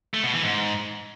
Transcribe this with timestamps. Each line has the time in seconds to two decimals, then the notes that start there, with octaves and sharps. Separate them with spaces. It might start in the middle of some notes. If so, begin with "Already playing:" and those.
0.14 A3
0.24 B2
0.33 E3
0.43 G#2